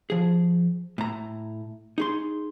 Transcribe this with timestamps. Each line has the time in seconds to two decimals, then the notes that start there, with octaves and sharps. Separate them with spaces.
0.10 F3 G#4
0.98 A2 A#5
1.98 D#4 G#4 C6